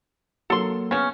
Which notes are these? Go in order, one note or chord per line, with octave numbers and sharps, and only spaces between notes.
F#3 A#3 A4 C6
C#3 B3 C#4